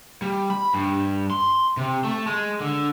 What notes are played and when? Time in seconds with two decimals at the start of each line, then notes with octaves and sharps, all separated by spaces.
0.22 G3
0.50 B5
0.74 G2
1.30 C6
1.77 C3
2.04 A3
2.27 G#3
2.60 D3